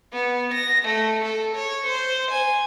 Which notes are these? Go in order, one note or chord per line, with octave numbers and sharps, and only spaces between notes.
B3
A#6
A3
A4
C#5
C5
G#5